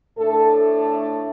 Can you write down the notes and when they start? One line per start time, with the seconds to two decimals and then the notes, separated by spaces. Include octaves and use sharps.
0.17 A2 A3 D4 A4